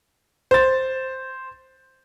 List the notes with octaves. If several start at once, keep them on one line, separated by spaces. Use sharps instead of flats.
C5 A6